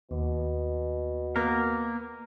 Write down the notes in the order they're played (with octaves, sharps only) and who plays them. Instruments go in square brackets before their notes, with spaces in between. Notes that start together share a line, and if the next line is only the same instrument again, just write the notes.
[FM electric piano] D#2 [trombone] B2
[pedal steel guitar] A#3 A#4 [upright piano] B3